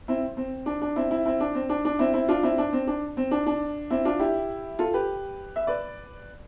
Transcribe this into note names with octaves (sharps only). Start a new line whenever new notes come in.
C4 E4
C4
D4
D4
C4 E4
C4 E4
C4 E4
D4
C4
D4
D4
C4 E4
C4 E4
D4 F4
C4 E4
D4
C4
D4
C4
D4
D4
C4 E4
D4 F4
E4 G4
F4 A4
G4 B4
E5
B4 D5